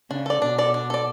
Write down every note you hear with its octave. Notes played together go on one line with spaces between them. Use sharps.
C#3 D4
A4 D5
B2 D4
A4 D5
D4
A4 D5